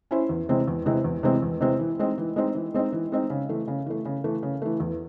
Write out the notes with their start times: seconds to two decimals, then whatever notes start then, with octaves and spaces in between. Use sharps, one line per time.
0.11 C#4 E4 C5
0.29 E2
0.49 C3 E3 G#3 C4
0.68 E2
0.86 C3 E3 G#3 C4
1.04 E2
1.23 C3 E3 G#3 C4
1.42 E2
1.61 C3 E3 G#3 C4
1.80 E3
1.99 G#3 C4 D#4
2.18 E3
2.36 G#3 C4 D#4
2.55 E3
2.74 G#3 C4 D#4
2.92 E3
3.12 G#3 C4 D#4
3.30 C#3
3.49 E3 A3
3.68 C#3
3.86 E3 A3
4.05 C#3
4.24 E3 A3
4.43 C#3
4.62 E3 A3
4.80 E2